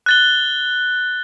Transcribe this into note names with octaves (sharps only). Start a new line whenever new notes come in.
F#6 A6 G7